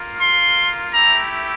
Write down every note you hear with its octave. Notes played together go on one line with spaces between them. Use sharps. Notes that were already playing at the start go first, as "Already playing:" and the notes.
Already playing: A#3 F4
C6
A3 E4 G4 A#5